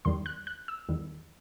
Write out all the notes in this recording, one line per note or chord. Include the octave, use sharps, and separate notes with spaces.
E2 D#3 G3 C6
F#6
F#6
E6
E2 D#3 G3